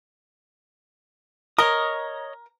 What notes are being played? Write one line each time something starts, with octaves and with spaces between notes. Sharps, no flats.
A#4 C#5 D#5 D#6